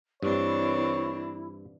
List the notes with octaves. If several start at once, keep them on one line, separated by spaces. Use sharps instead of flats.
G2 E3 C4 D4 E4 C#5